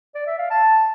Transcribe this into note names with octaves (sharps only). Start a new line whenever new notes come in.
D5
E5
F5
A5